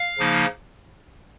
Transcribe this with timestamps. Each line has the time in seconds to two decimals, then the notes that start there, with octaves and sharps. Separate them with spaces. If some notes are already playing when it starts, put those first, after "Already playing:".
Already playing: F5
0.19 C#3 F3 A#3 D#4